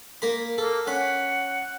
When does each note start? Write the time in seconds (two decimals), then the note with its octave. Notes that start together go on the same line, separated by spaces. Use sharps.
0.22 A#3 A#4 B5
0.58 A#3 A4
0.87 C#4 F#5 B5